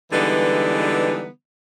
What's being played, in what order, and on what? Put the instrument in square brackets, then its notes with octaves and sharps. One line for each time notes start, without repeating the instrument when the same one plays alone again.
[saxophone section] D3 E3 G3 G#3 B3 D#4